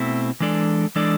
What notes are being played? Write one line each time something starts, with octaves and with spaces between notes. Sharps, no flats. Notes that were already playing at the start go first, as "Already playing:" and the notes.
Already playing: B2 A3 C4 E4
E3 G#3 D4 A4 D5
E3 G#3 D4 A4 D5